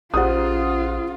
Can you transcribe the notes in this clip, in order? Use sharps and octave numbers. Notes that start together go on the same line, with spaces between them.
A#1 C#4 F4 G#4 C5 F#5 D#6